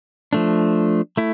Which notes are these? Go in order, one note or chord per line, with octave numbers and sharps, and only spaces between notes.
F3 A3 D4
A3 E4